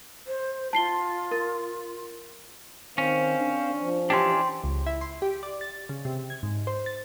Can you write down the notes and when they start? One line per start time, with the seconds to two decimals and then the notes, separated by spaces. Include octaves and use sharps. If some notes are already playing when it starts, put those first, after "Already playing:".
0.27 C5
0.73 F4 A5 C7 G7
1.31 A#4 A6
2.98 D#3 C4 C#4 C5 F5
3.39 D4
3.80 F3
4.10 E3 C#4 D4 G4 G5 C6
4.64 C#2
4.86 E4
5.01 C6
5.22 G4
5.43 D5
5.61 A6
5.89 C#3
6.05 C3
6.30 G#6
6.43 G#2
6.67 C5
6.86 A6